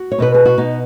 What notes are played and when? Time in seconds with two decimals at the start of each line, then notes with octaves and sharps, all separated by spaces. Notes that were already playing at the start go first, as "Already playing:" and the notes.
Already playing: F#4
0.12 C#5
0.18 B2 B3 B4
0.34 G#4
0.45 F#4
0.58 B2 B3 D#4